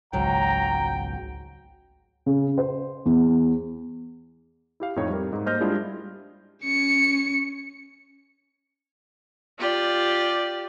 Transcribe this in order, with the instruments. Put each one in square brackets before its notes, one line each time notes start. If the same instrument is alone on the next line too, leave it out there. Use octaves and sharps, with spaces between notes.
[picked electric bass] G#1 C#2 [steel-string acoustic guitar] G#2 F#3 [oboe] G5 [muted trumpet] A#5
[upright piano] C#3
C5
E2
[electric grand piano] E4 G4 F5
F2 A2 C4 D#4 C#5
G3 A#4
G#2
A#3 C5 D#5 F6 G6 A#6
G3 G#3 D4 E4 F4 G#4
[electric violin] C#4 C#7
[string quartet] F4 G4 D5